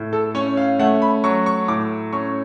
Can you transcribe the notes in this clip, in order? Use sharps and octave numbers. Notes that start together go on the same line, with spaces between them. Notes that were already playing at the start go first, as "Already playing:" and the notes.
Already playing: A2
A4
C#4 C#5
F5
A3 F#5
B5
F#3 C#6
C#6
A2 D6
C#4 C#6